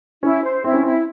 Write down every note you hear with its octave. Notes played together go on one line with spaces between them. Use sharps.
C#4 E4
C5
C4 E4
C#4
C4 E4